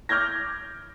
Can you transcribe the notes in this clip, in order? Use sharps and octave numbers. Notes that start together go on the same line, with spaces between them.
D6 F6 G6 G#6 A#6